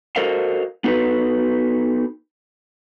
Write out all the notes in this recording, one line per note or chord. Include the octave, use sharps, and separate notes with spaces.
F#4 A4 A#4 C5 D#5 F5
B3 D#4 F#4 A4 B4